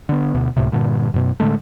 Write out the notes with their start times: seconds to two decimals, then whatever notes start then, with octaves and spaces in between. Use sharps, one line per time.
0.09 D3 B3
0.35 D2 B2
0.57 C#2 A2 C3
0.72 G2 A#2 D3
1.14 F#2 B2
1.40 A2 D3 G#3 A3